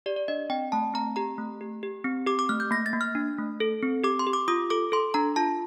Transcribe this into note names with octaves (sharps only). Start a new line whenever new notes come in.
G4 D5
D5
D4 D#5
C4 G5
A3 A5
C4 A#5
G4 A#5
A3
G4
G4
C4
G4 D6
D6
A3 F6
G6
A#3 A#6
A6
A#3
F6
D4
A3
A4
C4
G4 D6
C6
G4
D6
F4 D#6
A4 D6
A4 C6
D4 A#5
F4 A5